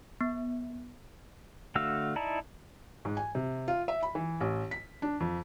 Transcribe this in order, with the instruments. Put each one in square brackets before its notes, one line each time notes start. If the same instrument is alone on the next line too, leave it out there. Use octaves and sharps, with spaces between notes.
[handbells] B3
[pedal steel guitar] D3 A3 F#4 F5 E6
D#4 E4 D5 A5 A#5
[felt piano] G#2
G#5
C3
F4
E5
B5
E3
A1
B6
D4
F2